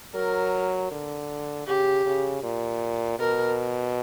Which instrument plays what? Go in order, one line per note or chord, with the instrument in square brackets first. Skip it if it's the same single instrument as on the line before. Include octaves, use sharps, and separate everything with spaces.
[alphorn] F#3 [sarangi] A#4
[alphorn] D3
[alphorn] C#3 [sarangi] G4
[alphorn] C#3
A#2
[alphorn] B2 [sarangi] A#4